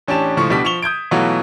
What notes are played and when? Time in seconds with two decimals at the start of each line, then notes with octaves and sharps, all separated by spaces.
0.08 A1 C#4 D4 G4 A5 E7
0.37 C#2 A2 F3 C#6
0.50 B2 G3 D4 B6
0.64 F3 C#6 E7 F7 G7
0.82 D#6 G6 G#6 D7
1.11 B2 E3 F#3 A3 F4